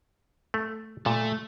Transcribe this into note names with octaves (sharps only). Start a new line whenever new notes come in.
A3
A#2 A3